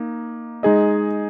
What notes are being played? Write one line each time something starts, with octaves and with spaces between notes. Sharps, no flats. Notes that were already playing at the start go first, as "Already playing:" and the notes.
Already playing: A#3 D#4
G#3 D#4 G#4 D#5